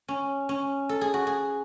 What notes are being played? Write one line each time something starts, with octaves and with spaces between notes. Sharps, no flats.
C#4
C#4
A4
G#4
F#4
G#4